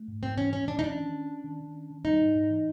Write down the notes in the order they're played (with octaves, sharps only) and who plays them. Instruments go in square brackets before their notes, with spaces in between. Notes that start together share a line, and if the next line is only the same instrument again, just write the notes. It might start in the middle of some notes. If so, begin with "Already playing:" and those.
Already playing: [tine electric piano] A3
G#2
[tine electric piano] G#2 [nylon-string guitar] C4
[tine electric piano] E3 [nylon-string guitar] C#4
[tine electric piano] E3 [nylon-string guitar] C#4
[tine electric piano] E3 [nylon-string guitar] D4
[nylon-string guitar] D#4
[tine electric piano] C#4 [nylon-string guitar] D4
[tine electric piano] D#3
C#4
C#4
D#3
D#3
C#4
D#3
[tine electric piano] G3 [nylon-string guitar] D#4
[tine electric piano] G#2
G#2
E3